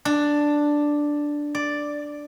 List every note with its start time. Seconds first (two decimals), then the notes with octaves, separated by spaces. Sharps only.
0.05 D4
1.55 D5